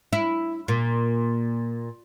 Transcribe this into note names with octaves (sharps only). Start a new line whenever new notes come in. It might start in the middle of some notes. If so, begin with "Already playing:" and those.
E4
A#2